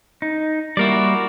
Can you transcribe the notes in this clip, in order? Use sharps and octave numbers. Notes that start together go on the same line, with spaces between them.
D#4
G3 A#3 E4 F#4 A#4 D5